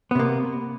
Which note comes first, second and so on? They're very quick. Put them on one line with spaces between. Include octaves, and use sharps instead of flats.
B3 C3 A#3